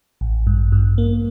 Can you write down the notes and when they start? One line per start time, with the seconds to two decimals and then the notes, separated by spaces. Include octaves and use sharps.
0.21 A1
0.47 G2
0.72 G2
0.98 A#3